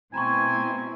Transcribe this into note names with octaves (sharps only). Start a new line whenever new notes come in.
B2 A3 C4 E4 G#5 A#5 B5 C#6